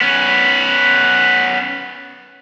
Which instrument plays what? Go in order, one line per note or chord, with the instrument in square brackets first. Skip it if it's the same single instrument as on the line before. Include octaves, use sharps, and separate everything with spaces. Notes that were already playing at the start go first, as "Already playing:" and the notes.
[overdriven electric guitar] B3 C#4